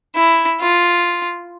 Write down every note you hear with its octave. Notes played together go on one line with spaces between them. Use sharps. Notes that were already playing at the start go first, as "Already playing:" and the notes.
E4
F4